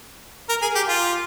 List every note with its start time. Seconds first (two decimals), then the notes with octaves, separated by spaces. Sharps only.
0.49 A#4
0.62 G#4
0.75 G4
0.89 F4